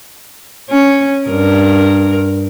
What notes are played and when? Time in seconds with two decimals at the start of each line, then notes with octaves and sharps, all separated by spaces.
0.70 C#4
1.28 G2 A#4